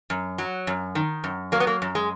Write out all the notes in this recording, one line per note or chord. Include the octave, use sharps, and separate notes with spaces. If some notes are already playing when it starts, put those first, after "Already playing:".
F#2
F#3
F#2
D#3
F#2
F#3 A#3
B3
A#3
F#2
G#3